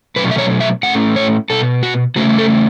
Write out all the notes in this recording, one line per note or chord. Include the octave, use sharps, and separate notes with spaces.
B2 F#3 A3 C#4 B4
E5
C#5
E5
A2 A3 C#4 F#5
C#5
B2 B3 A4
F#4
C#3 A3 C#4 F#4
A4